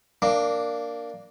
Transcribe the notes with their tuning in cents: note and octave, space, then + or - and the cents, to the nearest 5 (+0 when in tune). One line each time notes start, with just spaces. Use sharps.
A#3 -5 D4 +0